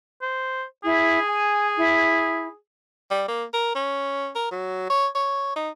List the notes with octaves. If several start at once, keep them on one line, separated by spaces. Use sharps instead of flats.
C5
E4 G#4
G#5
E4
G3
A#3
A#4
C#4
A#4
F#3
C#5
C#5
D#4